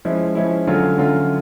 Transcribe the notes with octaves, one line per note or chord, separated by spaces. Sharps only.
F3 G#3 C#4 E4
F3 G#3 C#4 E4
D3 F#3 A3 C#4 F4
D3 F#3 A3 C#4 F4